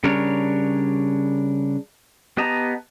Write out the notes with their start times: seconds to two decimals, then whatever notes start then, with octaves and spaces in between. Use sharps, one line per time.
0.04 C#3 G3 D4 A#4 C#5
2.37 B3 G4 D#5 A5 A#5